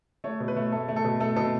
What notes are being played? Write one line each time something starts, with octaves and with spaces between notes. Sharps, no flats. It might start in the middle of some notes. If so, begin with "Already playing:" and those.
A3 C#5
B2
B4
A3
A3 A4
A3
A4
B2
A3 A4
B2 A4